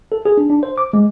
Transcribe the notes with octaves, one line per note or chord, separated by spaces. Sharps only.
A4
G#4
D4
D4
C5
D6
G#3